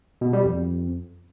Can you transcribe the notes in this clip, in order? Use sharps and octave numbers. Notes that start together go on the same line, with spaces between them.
B2
G3
F2